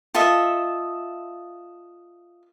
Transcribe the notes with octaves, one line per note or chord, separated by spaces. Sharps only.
F4 A4 D#5 E5